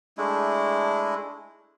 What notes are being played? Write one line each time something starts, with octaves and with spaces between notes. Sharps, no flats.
G#3 A3 D4 E4